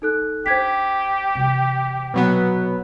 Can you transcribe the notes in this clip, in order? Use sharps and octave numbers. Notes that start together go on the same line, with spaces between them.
D#4 A4 F#6
D4 G4 C5 G#6 B6
C3 E3
B2 F#3 B3